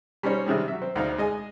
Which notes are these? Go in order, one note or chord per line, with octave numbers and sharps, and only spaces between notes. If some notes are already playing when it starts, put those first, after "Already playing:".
G3 C#4 D#4 C5 C#5
C3 D#3 G3 G#3
F#3 E5
C4
D2 C4 D#4 F5
G#3 D#5 G#5